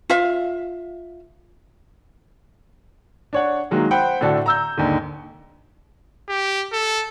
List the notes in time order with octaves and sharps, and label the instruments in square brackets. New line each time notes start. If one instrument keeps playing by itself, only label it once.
[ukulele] F4 E5 F5
[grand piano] D4 C#5 F#5
D#3 F#3 G#3 A#3
C5 F#5 G5 B5
A2 D3 D4 F#4 A4
A#5 E6 G6
D#2 G#2 D3
[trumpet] G4
A4